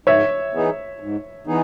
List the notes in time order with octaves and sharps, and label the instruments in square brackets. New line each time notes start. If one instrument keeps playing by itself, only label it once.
[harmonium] G#2 [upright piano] C#5 E5
[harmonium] E3 B3 D#4 G#4
G#2
E3 B3 D#4 G#4